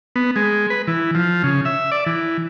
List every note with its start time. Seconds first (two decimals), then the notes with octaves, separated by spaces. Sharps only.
0.16 B3
0.36 G#3
0.70 B4
0.87 E3
1.15 F3
1.44 C#3
1.65 E5
1.92 D5
2.06 E3